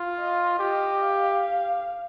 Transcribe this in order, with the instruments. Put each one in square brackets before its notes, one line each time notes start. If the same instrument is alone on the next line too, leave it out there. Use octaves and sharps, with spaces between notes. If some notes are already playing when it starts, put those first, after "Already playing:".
Already playing: [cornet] F4
[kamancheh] D#5
[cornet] G4 [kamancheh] D#5
[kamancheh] F5